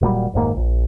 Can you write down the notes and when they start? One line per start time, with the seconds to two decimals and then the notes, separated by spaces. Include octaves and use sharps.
0.01 D#1 A#2 F#3 G3
0.34 F1 D#2 G#2 A#3
0.52 D#1 A#1